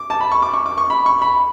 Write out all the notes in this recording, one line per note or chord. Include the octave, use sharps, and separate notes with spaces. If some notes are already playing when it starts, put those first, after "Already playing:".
Already playing: D6
A5
B5
C#6
D6
C#6
D6
C#6
B5
C#6
B5